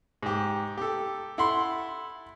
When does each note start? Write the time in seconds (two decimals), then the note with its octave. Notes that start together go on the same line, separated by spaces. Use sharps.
0.23 G#2 G4
0.78 G4 A4
1.38 E4 A4 F#5 B5 C6